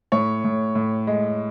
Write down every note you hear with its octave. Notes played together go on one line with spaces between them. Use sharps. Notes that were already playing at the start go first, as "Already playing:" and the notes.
A2 C#5
A2
A2
G#3